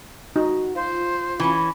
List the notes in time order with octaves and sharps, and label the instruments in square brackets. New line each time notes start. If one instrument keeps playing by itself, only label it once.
[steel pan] D#4 [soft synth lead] F#4
[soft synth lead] F4 [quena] C5
[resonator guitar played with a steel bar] E3 C#4